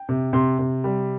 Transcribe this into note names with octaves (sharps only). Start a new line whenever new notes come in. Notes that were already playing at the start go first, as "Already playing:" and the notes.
Already playing: G5
C3
C3 C6
C3
G3